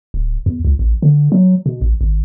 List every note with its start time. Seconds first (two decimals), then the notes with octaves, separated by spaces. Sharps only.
0.14 D1
0.46 E2
0.65 C#2
0.79 A1
1.02 D3
1.32 F#3
1.66 B2
1.81 A1
2.01 G#1